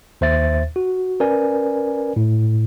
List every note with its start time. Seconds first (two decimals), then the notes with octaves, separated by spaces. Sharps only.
0.21 D#2 C5 E5 A6
0.76 F#4
1.20 C#4 A#4 B4 D5 G#5
2.16 A2